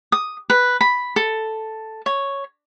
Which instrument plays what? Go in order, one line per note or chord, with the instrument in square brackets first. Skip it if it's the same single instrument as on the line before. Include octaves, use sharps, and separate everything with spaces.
[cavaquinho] D#6
B4
B5
A4
C#5